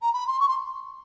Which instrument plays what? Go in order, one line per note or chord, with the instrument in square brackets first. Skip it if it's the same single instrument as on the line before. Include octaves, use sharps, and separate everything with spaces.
[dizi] A#5
B5
C6
C#6
C6